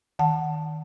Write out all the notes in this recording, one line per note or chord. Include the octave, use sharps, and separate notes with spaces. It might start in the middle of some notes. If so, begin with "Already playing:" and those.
D#3 F#5 A5